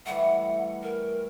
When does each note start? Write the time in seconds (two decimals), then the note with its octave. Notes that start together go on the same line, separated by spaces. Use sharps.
0.06 E3 G3 A3 F#5
0.83 A#4